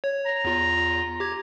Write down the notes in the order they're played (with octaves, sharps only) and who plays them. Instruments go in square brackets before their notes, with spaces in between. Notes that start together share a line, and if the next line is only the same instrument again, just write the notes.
[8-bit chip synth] C#5
[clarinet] A#5
[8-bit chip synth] E2 F4
G4 G#6